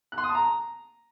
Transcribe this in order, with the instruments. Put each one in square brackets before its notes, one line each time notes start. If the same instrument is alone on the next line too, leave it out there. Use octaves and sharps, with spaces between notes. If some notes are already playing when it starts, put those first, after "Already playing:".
[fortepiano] F#6
C6
D#6
A5
A#5